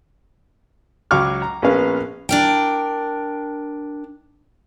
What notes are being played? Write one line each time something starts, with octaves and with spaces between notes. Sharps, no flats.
C#2 F#3 F5 C#6 D6 F6
A#5
A#1 A#3 B3 C#4 F5
D4 A#4 G5